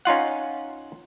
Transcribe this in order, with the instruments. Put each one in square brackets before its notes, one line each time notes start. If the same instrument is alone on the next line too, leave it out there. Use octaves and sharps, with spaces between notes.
[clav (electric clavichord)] C#4 D#4 F4 F#5